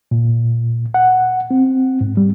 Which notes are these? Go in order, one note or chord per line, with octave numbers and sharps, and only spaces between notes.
A#2
F#5
C4
G#2
G3